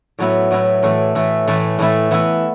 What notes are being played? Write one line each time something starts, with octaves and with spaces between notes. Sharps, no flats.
A2 F#3 B3 E4
A2 F#3 B3 E4
A2 E3 A3 E4
A2 E3 A3 E4
A2 E3 A3 E4
A2 E3 A3 E4
E3 B3 E4